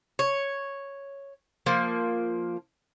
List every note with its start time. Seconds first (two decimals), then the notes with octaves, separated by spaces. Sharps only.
0.19 C#5
1.66 F3 A#3